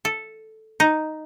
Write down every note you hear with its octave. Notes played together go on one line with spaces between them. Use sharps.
A4
D#4